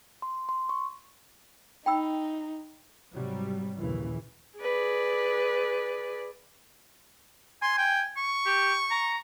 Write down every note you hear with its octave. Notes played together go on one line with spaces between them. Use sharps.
C6
C6
C#6
D#4 G5 B5 E6
G#2 C3 F#3 G3
A#1 D#2 A#2 C#3 E3
G#4 B4 D5
G#5 C6
G5
C#6
G4
A#5